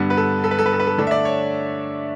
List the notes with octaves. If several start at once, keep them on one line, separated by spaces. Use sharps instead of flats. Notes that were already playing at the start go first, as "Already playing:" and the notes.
Already playing: G2 D3 G3 B3
B4
A4
A4
B4
A4
B4
A4
B4
A4
D3 A3 D4 A4
E5
D5
C#5